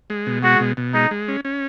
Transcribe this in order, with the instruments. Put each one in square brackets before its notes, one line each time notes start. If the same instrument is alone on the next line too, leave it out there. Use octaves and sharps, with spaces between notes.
[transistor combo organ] G#3
B2
[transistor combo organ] G#3 [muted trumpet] F#4
[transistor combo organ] B2
B2
[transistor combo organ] G#3 [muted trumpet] D#4
[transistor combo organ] G#3
C#4
C#4